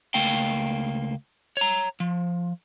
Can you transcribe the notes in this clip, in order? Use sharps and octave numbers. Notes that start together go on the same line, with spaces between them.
C#2 A3 A#3 F5 G5
C#5 A#5
F3